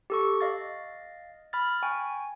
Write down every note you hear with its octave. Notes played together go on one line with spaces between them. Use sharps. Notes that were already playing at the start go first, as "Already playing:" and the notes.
G4 A4 C#6
D#5 F5 A6
B5 F6 A6
G5 G#5 C#6